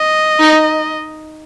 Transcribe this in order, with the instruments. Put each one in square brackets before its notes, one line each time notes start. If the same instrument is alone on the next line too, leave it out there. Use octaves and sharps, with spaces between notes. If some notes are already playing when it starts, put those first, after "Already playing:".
Already playing: [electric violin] D#5
[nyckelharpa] D#4